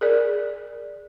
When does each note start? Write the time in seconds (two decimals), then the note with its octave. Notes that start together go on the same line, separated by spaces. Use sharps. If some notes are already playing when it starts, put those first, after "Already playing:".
0.01 G#4 A#4 D5